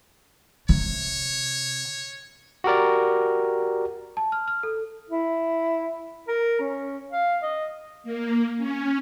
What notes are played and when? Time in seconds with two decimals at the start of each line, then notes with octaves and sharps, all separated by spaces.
0.69 C3 C#5
2.64 F#4 G4 A#4 D5
4.17 A5
4.32 F6
4.48 F6
4.63 A4
5.10 E4
6.28 A#4
6.60 C#4
7.11 F5
7.43 D#5
8.04 A#3
8.57 C#4